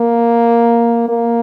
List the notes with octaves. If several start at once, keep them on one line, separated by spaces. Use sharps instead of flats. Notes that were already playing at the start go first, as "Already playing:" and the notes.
Already playing: A#3
A#3